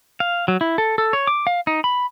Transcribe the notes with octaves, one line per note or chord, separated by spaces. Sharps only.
F5
F#3
E4
A4
A4
C#5
D6
F5
D#4
B5